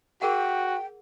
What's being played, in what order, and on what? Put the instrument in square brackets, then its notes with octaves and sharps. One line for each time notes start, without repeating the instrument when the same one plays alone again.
[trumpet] F#4 [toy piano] G#4 A#4 F#5 [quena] G5